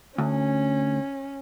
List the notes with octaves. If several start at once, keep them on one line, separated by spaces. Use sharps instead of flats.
D2 C#4